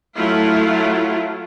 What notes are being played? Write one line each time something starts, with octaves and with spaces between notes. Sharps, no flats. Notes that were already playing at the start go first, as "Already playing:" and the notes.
F#3 A3 E4 F4